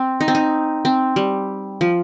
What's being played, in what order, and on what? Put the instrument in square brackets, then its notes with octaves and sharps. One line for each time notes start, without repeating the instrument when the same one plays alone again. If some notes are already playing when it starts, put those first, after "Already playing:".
Already playing: [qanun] C4
D#4
C4
D#4
C4
G3
F3